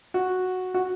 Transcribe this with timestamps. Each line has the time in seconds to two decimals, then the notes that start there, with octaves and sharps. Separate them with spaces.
0.14 F#4
0.74 F#4